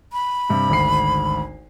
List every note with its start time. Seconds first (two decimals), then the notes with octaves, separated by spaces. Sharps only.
0.13 B5
0.49 G2 C3
0.69 G#1 D2 C7